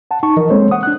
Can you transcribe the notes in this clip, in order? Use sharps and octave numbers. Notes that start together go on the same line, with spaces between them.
F#5 A5
D#4 A5 C#6
E3 F3 A#4 D#5
G#3 A#3 C4 A4 C5 C#5
F#5 D#6
D4 F#6